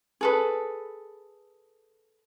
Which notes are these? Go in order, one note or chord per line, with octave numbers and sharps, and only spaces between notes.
G#4 A4 B4